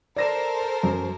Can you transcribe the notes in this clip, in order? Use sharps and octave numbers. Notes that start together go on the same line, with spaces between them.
A4 A#4 C5 D5 A#6 E7
F#2